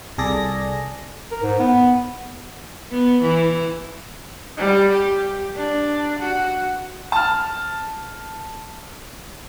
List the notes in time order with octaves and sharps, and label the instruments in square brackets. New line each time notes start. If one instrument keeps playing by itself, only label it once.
[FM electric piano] C2 G#4 A4 D5 A#6
[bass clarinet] A#4
G#2
B3
[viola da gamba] B3
E3
[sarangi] G3
G4
D4
F#4
[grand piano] A5 F6